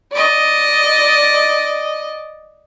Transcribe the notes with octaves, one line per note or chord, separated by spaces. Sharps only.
D5 D#5